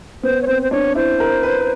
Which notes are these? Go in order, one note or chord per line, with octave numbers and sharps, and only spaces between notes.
B3 C5
C#5
C4 C5
C5
D4 C#5
E4 C5
A#4
B4